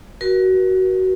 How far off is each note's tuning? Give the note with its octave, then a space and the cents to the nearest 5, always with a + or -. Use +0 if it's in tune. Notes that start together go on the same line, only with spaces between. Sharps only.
F#4 +15 A#4 +35